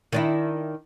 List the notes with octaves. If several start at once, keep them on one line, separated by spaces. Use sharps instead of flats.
D#3 D4 E4